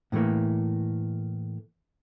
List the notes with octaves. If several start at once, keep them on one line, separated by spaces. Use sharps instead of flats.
A2 D3 E3 A3 A#3